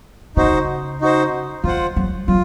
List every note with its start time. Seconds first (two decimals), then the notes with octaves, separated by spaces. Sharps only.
0.36 C#3 D#4 F#4 C5
1.01 D#4 F#4 C5
1.64 D#3 F4 C5 F#5
1.96 F#3
2.28 F#3 F4